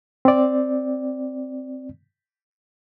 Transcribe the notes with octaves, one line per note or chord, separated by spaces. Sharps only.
C4 D5